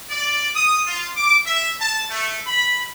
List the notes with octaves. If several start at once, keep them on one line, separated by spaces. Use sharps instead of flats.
D5
D#6
F4
D6
E5
A5
A3
B5